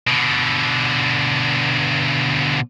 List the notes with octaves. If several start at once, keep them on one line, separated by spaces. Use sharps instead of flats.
B2 D3